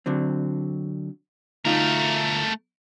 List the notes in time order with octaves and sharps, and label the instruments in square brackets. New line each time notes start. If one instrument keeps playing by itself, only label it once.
[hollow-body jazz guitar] D3 F#3 C4
[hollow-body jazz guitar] D2 D#4 F4 [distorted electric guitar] A3 A#4